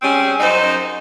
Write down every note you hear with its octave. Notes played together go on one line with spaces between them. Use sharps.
G3 C4 C#4 G#4
F#2 D#4 C5